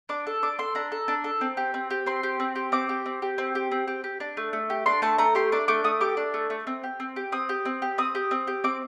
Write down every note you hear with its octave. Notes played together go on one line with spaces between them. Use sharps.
D4 D6
A4
D4 D6
A4 C6
D4 A#5
A4
D4
A4
C4
G4
C4
G4
C4 C6
G4
C4
G4
C4 D6
G4
C4
G4
C4
G4
C4
G4
G4
D4
A3
A3
G4
D4 C6
A3 A5
A3 A#5
G4 C6
D4 D6
A3 D6
A3 D#6
G4 D6
D4
A3
A3
C4
G4
C4
G4
C4 D#6
G4
C4
G4
C4 D#6
G4
C4
G4
C4 D6